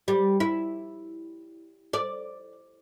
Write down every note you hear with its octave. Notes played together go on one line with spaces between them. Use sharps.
G3
E4
D5